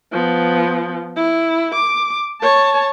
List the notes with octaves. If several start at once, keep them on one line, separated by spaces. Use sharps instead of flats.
F3 B3
E4
D6
C#5 A5